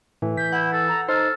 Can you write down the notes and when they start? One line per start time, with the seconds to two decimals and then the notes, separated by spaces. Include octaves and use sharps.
0.22 A2 E3
0.37 G6 B6
0.53 E4 F#5
0.73 A4
0.88 A#5
1.09 D#4 A4 C5 F6